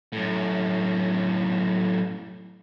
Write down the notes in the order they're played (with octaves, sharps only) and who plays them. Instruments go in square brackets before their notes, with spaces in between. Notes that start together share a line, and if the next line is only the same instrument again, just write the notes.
[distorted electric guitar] F#2 A2